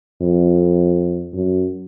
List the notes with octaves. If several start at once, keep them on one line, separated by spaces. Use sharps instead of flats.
F2
F#2